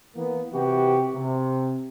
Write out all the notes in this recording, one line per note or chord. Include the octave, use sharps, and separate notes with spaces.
E3 A#3 B3
C3 E3 F#4 G4
C3